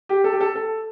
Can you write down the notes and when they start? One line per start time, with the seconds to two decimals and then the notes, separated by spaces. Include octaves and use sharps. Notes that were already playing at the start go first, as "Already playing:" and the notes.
0.09 G4
0.24 A4
0.33 G4
0.40 A4
0.55 A4